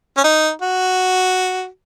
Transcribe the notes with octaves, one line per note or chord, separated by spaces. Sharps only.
C#4
D#4
F#4